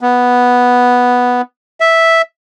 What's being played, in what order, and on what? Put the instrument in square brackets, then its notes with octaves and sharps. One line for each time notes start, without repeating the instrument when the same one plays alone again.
[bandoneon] B3
E5